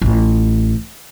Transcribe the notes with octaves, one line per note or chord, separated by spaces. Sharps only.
A1 F4